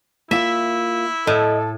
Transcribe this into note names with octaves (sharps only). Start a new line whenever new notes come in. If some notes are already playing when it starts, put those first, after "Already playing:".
A#3 E4 F4 E5
A2 A4 D#5